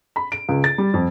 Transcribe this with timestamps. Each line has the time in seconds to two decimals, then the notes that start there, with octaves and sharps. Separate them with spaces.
0.16 B5
0.32 D7
0.49 C#2
0.64 A6
0.78 G3
0.94 F2